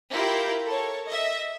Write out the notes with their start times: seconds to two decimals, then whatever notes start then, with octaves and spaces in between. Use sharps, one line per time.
0.10 E4 F4 G4 A#4 G5 G6
0.65 A4 A#4 C#5
1.09 D#5 E5